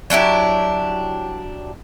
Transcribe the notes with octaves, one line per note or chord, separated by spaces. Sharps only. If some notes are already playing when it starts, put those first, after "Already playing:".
F#3 D4 E4 G4